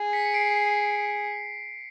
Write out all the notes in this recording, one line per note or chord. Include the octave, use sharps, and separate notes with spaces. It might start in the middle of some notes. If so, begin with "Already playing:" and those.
Already playing: G#4
B6 C#7
C#7
C7 D7
C7